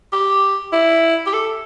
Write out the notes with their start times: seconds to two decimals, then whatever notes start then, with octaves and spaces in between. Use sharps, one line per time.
0.13 G4
0.73 E4
1.26 G4
1.33 A4